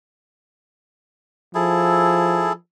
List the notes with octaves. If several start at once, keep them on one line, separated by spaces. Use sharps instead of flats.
F3 E4 G#4 A4